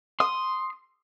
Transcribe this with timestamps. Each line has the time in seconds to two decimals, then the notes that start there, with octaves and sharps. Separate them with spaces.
0.20 C6 D#6